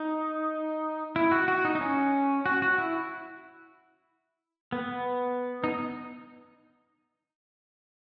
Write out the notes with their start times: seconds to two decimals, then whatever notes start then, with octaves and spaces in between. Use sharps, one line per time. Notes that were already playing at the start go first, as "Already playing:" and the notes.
Already playing: D#4
1.16 E4
1.32 F#4
1.48 F#4
1.65 D#4
1.75 D#4
1.81 C#4
2.46 F#4
2.62 F#4
2.78 E4
4.72 B3
5.64 D#4